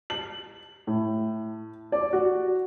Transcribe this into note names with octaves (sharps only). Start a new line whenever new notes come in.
F#7
A2
D5
F#4